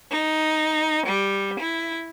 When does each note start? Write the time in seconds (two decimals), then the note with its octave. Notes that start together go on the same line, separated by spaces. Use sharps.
0.11 D#4
1.05 G3
1.58 E4